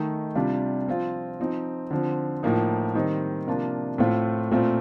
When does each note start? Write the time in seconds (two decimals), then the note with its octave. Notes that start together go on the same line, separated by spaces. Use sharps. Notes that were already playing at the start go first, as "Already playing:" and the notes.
Already playing: D#3 A3 D#4
0.35 C3 G3 D4 F4
0.87 F3 C4 F4
1.40 F3 C4 D#4
1.91 D3 F3 C4
2.43 A2 F3 A#3 D#4
2.95 D#3 G3 C4 D#4
3.47 C3 F3 A#3 D4 F4
3.98 A2 A3 C4 F4
4.51 A#2 A3 C4 F4